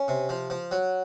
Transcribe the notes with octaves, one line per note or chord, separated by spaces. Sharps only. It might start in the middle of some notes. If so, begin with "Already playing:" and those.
Already playing: C#4
C3
F3
F3
F#3